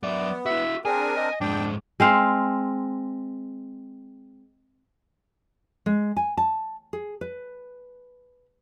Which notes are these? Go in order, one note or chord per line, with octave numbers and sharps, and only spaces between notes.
F#3 B3 D5 E5
E4 F#4 E5
C4 D4 G#4 A#4 G#5
D#5
F2 G#2 D4 G5
G#3 C4 F5
G#3
G#5
A5
G#4
B4